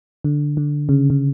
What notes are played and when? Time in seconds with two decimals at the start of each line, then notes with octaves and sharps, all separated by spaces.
0.24 D3
0.57 D3
0.89 C#3
1.10 C#3